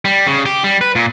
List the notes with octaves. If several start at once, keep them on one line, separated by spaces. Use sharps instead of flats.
G3
C#3
G4
G3
B4
A#2